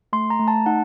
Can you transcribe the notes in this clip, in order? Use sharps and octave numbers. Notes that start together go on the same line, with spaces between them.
A3 C6
A#5
A3
A5
D#4 F#5